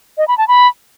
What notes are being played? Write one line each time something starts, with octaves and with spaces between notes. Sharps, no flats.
D#5
B5
A5
B5